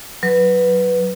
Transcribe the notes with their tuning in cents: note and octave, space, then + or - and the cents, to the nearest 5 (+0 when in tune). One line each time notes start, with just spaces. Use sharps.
F#3 +0 B4 +0